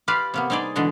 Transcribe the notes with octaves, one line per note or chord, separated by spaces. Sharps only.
F4 G4 B4 D5 F5
C3 A#3 B3
G3 C4 D#4 G#4 D5
B2 D3 E3 G#3